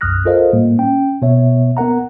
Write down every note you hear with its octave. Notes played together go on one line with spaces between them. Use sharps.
B1 F#2 D#6 F6 F#6 A#6
F4 A4 A#4 C5 D#5 F5
A2 G3 A#3
C#4 G5
B2 B3 C#5 E5
B3 A#4 F#5 A#5